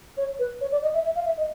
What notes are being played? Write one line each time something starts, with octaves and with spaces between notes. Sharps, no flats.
C#5
B4
C#5
D5
D#5
E5
E5
F5
E5
D#5